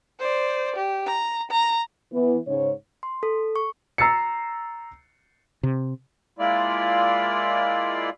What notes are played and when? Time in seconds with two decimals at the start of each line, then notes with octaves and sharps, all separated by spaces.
0.19 C5 D5
0.76 G4
1.07 A#5
1.51 A#5
2.13 E3 B3
2.47 G#2 C#3 C#5
3.03 C6
3.23 A4
3.56 C#6
3.98 A#5 E6 A6 C7 C#7
5.63 C3
6.39 G#3 A#3 E4 F4 D5